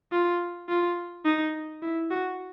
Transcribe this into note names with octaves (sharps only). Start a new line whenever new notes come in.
F4
F4
D#4
E4
F#4